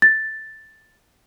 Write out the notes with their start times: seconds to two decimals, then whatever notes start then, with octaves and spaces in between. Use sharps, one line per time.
0.02 A6